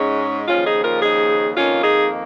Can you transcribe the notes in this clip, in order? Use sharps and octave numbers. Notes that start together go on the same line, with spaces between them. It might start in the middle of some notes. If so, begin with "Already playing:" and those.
Already playing: G#2 G#3 C#4
D#2 C#3 F3 C#4 F4
D#4 G#4
F4 A#4
D#4 G#4
F2 D#3 A#3 C#4 F4
D#4 G#4